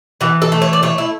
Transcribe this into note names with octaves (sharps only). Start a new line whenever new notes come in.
E3 B3
A4
A3
C#5
D5
A3 C#5
E4